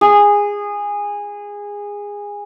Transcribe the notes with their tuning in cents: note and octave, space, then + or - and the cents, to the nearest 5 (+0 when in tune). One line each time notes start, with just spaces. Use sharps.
G#4 -20